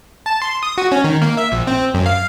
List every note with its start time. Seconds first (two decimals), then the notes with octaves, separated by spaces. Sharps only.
0.26 A5
0.42 C6
0.63 D#6
0.78 F#4
0.92 C#4
1.04 D#3
1.22 A#3
1.37 E5
1.52 A#1
1.67 C4
1.94 F#2
2.06 F5